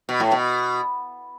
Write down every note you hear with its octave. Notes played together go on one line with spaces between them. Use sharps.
B2
A2
B2